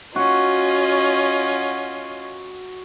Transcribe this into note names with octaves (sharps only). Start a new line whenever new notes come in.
C#4 F4 F#4 D#5